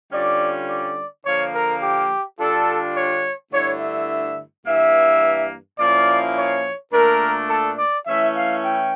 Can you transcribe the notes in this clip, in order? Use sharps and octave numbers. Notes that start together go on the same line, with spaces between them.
D3 G3 C#4 F4 D5
D5
D3 F3 A#3 C#5
A#4
G4
D3 G3 D4 F4 A4
C#5
G2 D3 A3 E4 C#5
E5
G2 E3 A#3 E5
A#2 F3 A#3 C#4 E4 D5
C#5
A#2 A3 D4 A#4
A4
D5
E3 A3 C#4 E4 E5
F5
G5